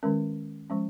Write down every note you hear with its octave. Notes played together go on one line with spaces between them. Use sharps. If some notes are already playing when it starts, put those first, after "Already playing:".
D#3 G#3 C#4 A#4
F3 G#3 C#4